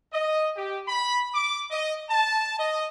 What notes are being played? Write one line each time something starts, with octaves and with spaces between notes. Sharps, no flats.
D#5
G4
B5
D6
D#5
A5
D#5